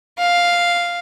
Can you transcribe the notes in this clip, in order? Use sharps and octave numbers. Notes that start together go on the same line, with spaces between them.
F5